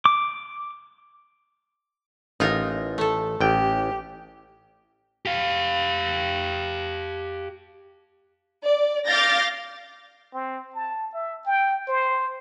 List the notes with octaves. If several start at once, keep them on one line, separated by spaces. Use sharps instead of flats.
D6
A1 D#4 F4 A#4
A3 A4
A1 G4 G5
G4 F5
D5
F5 D6 F6 G6 A6 A#6
C4
A5
E5
G5
C5